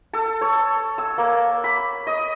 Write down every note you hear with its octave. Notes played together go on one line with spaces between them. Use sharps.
A4
C#5
E6
A#3
B5
D#5